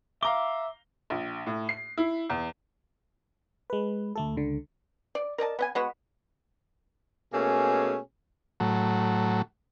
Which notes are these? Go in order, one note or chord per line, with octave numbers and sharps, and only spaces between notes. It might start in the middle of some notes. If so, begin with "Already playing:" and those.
E5 F5 A#5 D6 G7
A#1
A2
C7
E4
E2
G#3 B4
D2 A3 A4
C#2 D3
D5
A#4 D5 D#5 A5
B3 D#5 G#5
G#3 B3 F#4
B2 A3 A#3 C#4 G#4
A2 F#3